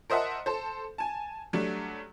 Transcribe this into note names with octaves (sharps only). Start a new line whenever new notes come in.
A#4 C5 D#5 E5 F#5 A5
A4 C5
G#5 A5
F#3 G3 A3 D4